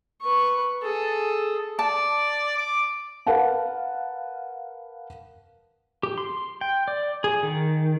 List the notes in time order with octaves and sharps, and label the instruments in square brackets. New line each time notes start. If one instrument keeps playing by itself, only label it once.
[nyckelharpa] B4 C#6
G#4 A4
[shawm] D5 [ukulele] A5
[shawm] D6
[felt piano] A#4 B4 F5 F#5 A5
[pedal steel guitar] G4
C6
G5
D5
G#4
D#3